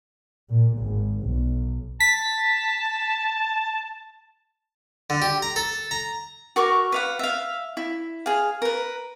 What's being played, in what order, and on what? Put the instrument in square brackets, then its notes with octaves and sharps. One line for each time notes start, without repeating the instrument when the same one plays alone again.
[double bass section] A#2
G#1
B1
[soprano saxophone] A5 [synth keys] B6
[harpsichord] D3
G4
A#5
A4
A#5
[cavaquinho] F#4 A#4 C#6 D6
B4 F5 F#5
E5 F5
E4
G#4 F5
A#4 B4